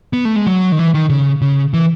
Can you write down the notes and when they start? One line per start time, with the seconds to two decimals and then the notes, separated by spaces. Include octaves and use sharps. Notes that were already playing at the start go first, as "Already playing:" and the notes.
0.13 B3
0.25 A3
0.36 G#3
0.46 F#3
0.72 D#3
0.79 E3
0.94 D#3
1.09 C#3
1.42 C#3
1.74 E3